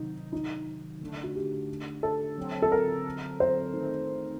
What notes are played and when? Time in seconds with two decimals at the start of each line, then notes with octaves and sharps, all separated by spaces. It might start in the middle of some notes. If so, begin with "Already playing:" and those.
Already playing: C3 D#3 F#3 D#4
0.32 D#4
1.01 D3 A3 D4
1.23 F#4
1.35 G4
2.03 A4
2.37 D3 F#3 C4
2.62 A4
2.72 A#4
3.40 C5
3.73 D#3 A3 C4 D#4